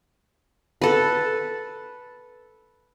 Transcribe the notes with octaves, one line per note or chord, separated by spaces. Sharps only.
A4 B4